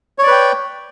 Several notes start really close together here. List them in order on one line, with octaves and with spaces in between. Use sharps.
C#5 D5 B4 G5